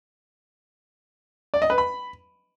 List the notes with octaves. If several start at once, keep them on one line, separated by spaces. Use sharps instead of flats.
D5
D#5
B4
B5